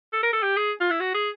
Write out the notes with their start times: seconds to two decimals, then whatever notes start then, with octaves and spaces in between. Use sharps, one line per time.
0.13 A4
0.23 A#4
0.33 A4
0.42 G4
0.57 G#4
0.81 F4
0.90 E4
1.00 F#4
1.14 G#4